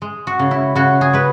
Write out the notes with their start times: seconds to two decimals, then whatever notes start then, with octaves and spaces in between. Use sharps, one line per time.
0.02 G#3
0.27 F#4
0.39 C#3
0.51 E4
0.75 C#3 F#4
1.01 G#4
1.13 G#3 B4